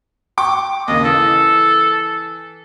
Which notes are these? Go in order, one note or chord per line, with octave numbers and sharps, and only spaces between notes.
G5 C#6 D6
D#2 C#3 D#5
E3 A4